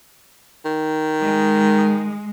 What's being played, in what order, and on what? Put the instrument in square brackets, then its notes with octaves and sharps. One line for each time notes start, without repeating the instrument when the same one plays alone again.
[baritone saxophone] D#3
[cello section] G#3